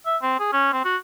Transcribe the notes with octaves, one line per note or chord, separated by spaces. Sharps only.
E5
C4
G#4
C#4
C4
F#4